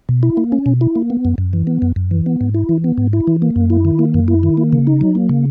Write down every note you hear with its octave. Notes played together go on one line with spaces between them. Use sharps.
B2
E4
A#3
C#4
B2
E4
A#3
B3
F#2
F#2
E3
B3
F#2
F#2
E3
B3
G#2
E4
E3
B3
G#2
E4
E3
A#3
F#2
E4
D#3
A#3
F#2
E4
D#3
A#3
C#3
D#4
F#3
A#3
C#3